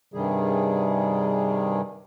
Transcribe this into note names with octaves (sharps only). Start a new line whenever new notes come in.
G2 C3 D#3 G3 G#4